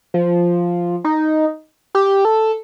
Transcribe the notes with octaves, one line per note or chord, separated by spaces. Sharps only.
F3
D#4
G4
A4